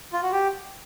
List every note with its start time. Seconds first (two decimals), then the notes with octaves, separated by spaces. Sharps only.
0.13 F4
0.23 F#4
0.32 G4